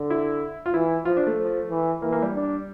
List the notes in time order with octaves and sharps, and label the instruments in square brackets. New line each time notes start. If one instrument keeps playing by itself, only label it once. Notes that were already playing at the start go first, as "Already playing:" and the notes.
Already playing: [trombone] D3
[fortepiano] E4
F4
[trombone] E3 [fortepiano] E4
[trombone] F3 [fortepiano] F4
[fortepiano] D4
A3
[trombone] F3
E3
[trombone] E3 [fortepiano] A#3
[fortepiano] A#3
G3
[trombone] D4